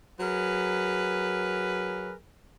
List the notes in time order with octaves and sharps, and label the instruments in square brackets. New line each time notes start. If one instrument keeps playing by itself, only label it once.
[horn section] F#3 G#4 A#4 B4